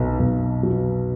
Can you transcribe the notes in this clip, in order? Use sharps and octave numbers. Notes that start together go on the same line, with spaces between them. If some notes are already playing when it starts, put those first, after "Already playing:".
Already playing: B1 B2
B1
F#3